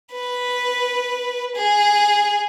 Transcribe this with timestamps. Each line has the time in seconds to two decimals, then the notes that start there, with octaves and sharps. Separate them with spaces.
0.13 B4
1.56 G#4